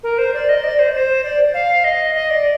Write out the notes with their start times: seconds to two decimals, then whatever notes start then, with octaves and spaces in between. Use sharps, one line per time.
0.03 A#4
0.18 C5
0.34 D5
0.49 D#5
0.64 D5
0.79 C5
0.93 C5
1.24 D5
1.54 F5
1.84 D#5
2.15 D#5
2.30 D5